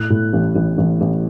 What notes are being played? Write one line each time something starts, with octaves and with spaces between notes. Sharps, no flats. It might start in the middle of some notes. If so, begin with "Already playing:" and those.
Already playing: A2 F#6
A2
A1
A1
A1
A1